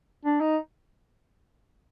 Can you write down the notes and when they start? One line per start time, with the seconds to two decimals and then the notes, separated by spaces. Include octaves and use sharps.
0.25 D4
0.41 D#4